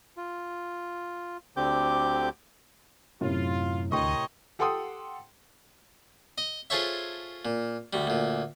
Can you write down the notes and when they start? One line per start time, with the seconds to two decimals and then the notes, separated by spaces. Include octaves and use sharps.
0.17 F4
1.57 D2 D3 C4 G4 D6 G6
3.21 F#2 A2 C3 F4
3.92 D2 A#4 C#5 D#5 G5 C6 C#6
4.59 G4 A4 F#5 G5 C6 D#6
6.38 D#5
6.70 F4 G#4 A4 C5 C#5 E5
7.45 A#2
7.93 D2 G3
8.07 D2 A#2